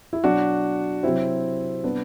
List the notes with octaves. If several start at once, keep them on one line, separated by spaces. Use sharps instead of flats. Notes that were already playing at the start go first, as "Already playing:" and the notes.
E4
B2 F#3 D4 F#4
C3 F#3 C4 E4
C3 G3 B3 D4